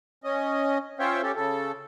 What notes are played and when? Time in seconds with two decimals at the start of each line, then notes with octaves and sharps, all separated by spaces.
0.24 C#4 D#5
0.99 C#4 F4 C5 C#5 E5 G5
1.23 C#4 G4 A4
1.36 C#3 A4